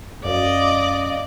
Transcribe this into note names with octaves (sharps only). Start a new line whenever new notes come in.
F#2 D5 D#5 F5